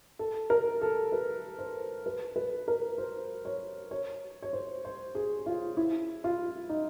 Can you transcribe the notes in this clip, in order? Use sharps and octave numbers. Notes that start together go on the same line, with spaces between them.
A4
A#4
A4
B4
C5
B4
B4
A#4
C5
C#5
C#5
C#5
C5
C5
G#4
F4
E4
F4
D#4